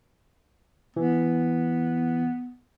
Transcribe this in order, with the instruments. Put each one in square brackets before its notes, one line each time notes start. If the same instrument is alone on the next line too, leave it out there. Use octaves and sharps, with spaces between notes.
[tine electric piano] E3 [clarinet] B3